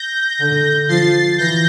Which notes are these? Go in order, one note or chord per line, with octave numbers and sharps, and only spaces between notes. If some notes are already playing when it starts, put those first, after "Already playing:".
Already playing: G6 A#6
D3
F3 A6 C7
E3 G6 A#6